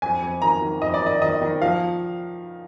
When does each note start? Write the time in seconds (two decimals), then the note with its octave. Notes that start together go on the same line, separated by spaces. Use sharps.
0.02 F2 G#5
0.22 F2
0.42 D#3 A#5
0.62 D#3
0.82 F2 D#5
0.94 D5
1.02 D#3 D#5
1.21 D#3 D#5
1.41 D#3
1.61 F3 F5